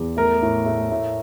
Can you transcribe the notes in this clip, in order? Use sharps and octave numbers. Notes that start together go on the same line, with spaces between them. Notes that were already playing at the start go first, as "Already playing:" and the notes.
Already playing: E2
A3 A#4
A2
A3
A2